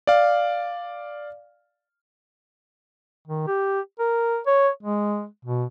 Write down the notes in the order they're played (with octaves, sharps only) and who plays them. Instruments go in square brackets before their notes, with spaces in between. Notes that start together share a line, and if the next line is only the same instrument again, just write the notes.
[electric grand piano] D5 F5
[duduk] D#3
G4
A#4
C#5
G#3
B2